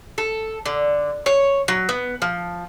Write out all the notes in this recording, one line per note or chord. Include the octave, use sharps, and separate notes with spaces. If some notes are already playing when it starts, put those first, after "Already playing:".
A4
D3
C#5
F#3
B3
F3